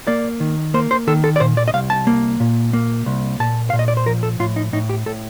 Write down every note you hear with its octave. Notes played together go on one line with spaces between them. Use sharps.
A#3 D5
D#3
A#3 C5
C5
D#3 A4
A4
D5
A#2 C5
D5
D#5
C2 F5
A5
A#3
A#2
A#3
C2
A#2 A5
A#2 F5
D#5
D5
C5
F3 A#4
A4
A2 F4
D#4
A2 D#4
G4
A2 A4